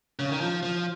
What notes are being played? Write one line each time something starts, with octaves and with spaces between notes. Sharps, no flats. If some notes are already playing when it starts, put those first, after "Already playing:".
C#3
D#3
F3
F3